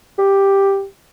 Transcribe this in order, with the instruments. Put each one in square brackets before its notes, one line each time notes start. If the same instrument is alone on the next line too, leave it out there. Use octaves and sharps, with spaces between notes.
[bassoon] G4